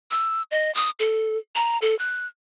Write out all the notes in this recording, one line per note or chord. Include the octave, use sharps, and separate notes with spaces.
E6
D#5
D#6
A4
A#5
A4
F#6